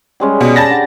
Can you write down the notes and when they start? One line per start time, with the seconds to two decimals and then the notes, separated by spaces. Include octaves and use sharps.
0.20 G3 G#3 C#4
0.41 B2 G5
0.56 D5 A5 B5 A6 A#6
0.70 D3